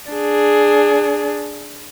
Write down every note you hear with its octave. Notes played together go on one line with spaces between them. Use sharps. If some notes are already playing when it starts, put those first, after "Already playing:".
D4 G#4